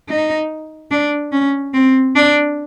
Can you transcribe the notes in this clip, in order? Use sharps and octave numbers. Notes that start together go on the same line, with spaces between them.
D#4
D4
C#4
C4
D4